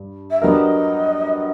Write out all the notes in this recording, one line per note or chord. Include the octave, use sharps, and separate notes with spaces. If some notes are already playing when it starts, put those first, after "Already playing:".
Already playing: G2
E5
F#3 B3 D4 G4 A#4 D#5